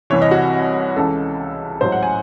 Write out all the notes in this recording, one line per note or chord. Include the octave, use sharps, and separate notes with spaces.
C2 C3 E3 C#5
D#5
F#4
C#2 C#3 E3 A4
A1 G#2 F#3 C5
F#5
G#5